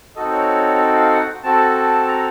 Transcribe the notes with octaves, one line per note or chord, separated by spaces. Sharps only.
C4 D#4 F#4 A4 D#5
C#5
F5
F#5
C4 F#4 A4 A5
A#5